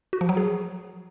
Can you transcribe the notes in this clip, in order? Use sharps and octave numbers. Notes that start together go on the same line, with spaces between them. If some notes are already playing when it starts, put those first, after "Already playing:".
F#4
F3
F#3
G#4